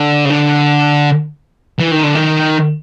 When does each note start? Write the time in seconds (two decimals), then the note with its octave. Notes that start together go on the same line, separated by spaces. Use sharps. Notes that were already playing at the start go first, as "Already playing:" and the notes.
Already playing: D3
0.25 C#3
0.30 D3
1.79 E3
1.91 D#3
2.03 D3
2.15 D#3